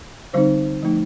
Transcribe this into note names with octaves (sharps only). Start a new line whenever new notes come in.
D3 G3 C4 D#4 C5
F3 A3 D#4